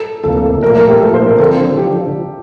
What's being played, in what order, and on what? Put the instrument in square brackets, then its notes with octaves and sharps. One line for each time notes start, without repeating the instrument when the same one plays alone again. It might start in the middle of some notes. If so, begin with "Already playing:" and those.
Already playing: [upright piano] A4
[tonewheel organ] D2 C3 F3 A#3 [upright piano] A4
[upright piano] A4
[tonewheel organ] A#2 F3 A3 [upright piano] A#4
[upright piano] A#4
G4
[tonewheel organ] A#2 F3 A3 [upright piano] A4
[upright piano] C5
A#4
[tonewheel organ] D3 F3 C4 [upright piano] A4
[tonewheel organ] D3 F3 [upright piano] G4